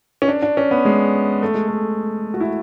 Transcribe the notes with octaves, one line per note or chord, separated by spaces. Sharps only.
C#4
D4
D4
C#4
B3
G#3
A3
G#3
A3
F#4
E4